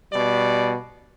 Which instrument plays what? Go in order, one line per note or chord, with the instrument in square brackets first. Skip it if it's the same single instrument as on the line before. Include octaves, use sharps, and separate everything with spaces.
[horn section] B2 G3 D5